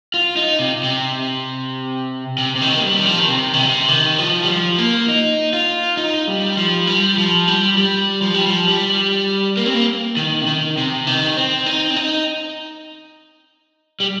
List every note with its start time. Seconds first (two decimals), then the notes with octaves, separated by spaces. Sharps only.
0.14 F4
0.36 D#4
0.59 C3
0.83 C3
2.38 C3
2.56 C3
2.61 D#3
2.69 C4
2.76 A#3
2.83 G3
2.99 D#3
3.06 F3
3.19 D#3
3.28 C3
3.53 D#3
3.58 C3
3.88 D#3
4.18 F3
4.43 G3
4.48 F3
4.78 A#3
5.08 D#4
5.53 F4
5.97 D#4
6.28 G3
6.57 F3
6.87 G3
7.18 F3
7.48 G3
7.78 G3
8.22 F3
8.34 G3
8.47 F3
8.68 G3
9.57 A#3
9.66 C4
9.74 A#3
10.17 D#3
10.42 C3
10.46 D#3
10.77 C3
11.07 D#3
11.37 C4
11.66 D#4
11.90 C4
11.96 D#4
14.00 G3